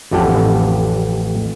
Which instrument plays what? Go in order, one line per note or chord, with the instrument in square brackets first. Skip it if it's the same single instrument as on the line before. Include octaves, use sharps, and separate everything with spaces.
[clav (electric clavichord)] A1 F2 G4 A4 F#5